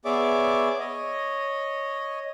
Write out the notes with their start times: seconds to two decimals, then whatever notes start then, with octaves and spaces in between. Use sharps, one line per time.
0.05 B3 G#4 C#5 D5 E5 D6
0.79 C#5 D#5